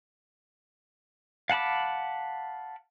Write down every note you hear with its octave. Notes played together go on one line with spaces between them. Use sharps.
F5 F#5 A5 B5 D6